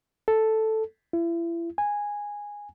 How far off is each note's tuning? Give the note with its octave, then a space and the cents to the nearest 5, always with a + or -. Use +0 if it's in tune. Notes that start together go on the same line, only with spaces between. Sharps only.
A4 +0
E4 +35
G#5 -10